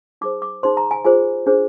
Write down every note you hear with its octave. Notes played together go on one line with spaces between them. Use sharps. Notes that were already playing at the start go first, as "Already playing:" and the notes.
D#4 G#4 C5 D6
D6
D#4 G#4 C5 C6
A#5
G#5
F4 G#4 C5 G#5
D4 G#4 C5